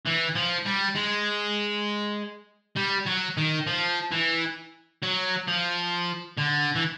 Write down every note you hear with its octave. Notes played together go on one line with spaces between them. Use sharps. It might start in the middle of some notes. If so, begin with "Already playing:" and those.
E3
F3
G3
G#3
G3
F#3
D#3
F3
E3
F#3
F3
D3
E3